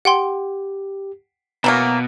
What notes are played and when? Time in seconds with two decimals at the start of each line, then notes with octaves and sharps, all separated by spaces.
0.05 G4 F#5 G5 C6
1.64 B2 E3 F#3 A#3 A#5